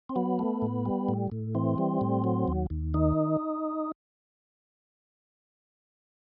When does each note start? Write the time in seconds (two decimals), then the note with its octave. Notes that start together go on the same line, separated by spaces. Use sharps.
0.09 C4
0.16 F#3 B3
0.39 A3
0.62 A2
0.86 G3
1.08 A2
1.32 A2
1.55 E3 C4
1.78 G3
2.01 A2
2.24 F#3
2.48 D#2
2.70 D#2
2.94 D#3 D#4